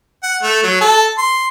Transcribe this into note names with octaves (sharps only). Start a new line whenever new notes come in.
F#5
A3
F#3
A4
C6